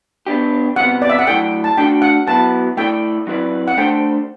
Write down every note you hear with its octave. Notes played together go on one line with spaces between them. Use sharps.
B3 D4 G4
C3 G3 B3 F#5
D5
E5
F#5
F#3 A3 E4 A4 D5 G5
A5
A3 D4 F#4 A4 G5
F#5
F#3 B3 E4 A5
A3 E4 A4 D5 G5
F#3 C4 E4 B4 D5
F#5
A3 D4 A4 C5 G5